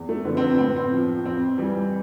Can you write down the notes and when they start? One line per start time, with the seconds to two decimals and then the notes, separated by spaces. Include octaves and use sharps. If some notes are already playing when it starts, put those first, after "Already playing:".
Already playing: E2
0.09 A3
0.25 D3 F3 B3
0.37 C4
0.42 B3
0.58 A2 C4
0.67 B3
0.76 C4
0.92 F3
1.25 F2 C4
1.58 E3 G3